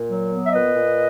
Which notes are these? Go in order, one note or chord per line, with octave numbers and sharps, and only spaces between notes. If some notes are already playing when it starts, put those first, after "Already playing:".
Already playing: A#2
F#3
B3
E5
A#2 B4 D#5
A#2